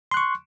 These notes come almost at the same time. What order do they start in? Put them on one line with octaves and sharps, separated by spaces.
C6 F#6 C#6